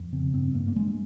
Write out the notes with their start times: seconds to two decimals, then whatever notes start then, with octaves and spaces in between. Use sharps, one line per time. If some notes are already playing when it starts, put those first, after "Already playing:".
Already playing: F2
0.13 C#3 C4
0.34 G2 C4
0.55 G2 A#3
0.68 A#3
0.76 G2 G#3